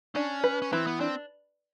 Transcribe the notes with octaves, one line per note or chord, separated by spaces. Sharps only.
C#4 D4
B4
C#4
E3 C4
B3
C4 D4